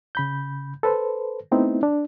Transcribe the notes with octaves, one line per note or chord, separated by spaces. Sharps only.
C#3 B5 G6
A4 B4 C5
A3 B3 C4 D#4 E4
D4